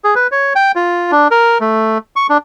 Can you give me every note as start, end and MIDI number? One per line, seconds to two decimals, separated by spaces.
0.04 0.15 68
0.15 0.27 71
0.32 0.53 73
0.56 0.72 79
0.76 1.11 65
1.11 1.28 62
1.31 1.58 70
1.60 1.98 57
2.16 2.27 85
2.30 2.38 62